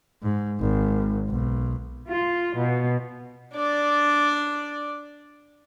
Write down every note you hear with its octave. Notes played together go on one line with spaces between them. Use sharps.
G#2
G#1
B1
F4
B2
D4 D5